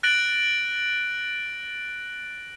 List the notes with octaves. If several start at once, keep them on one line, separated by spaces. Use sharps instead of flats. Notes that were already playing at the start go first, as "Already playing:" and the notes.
F#6 A6 A#6 D7 F#7